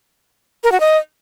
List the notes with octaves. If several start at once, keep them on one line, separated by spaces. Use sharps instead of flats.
A#4
F#4
D#5